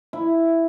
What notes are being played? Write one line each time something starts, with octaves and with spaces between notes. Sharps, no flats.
E4